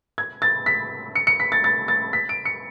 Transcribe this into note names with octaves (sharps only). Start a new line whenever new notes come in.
G#6
A6
B6
C#7
C#7
B6
A6
A6
A6
B6
D7
C#7